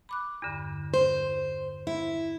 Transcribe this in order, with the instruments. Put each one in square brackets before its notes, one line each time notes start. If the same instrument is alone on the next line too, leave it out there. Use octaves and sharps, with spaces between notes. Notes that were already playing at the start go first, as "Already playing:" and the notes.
[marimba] B5 D6 F#6
E2 G2 D3
[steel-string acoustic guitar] C5
E4